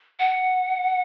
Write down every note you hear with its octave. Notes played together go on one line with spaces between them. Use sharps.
F#5